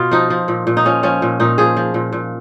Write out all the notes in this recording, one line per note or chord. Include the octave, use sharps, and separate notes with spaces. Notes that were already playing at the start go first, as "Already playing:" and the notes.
Already playing: B2 F4
F3 D#4
F3
A#2
A#2
D#4
F3 C#4
F3 C#4
A#2
A#2 D#4
F3 G#4
F3
A#2
A#2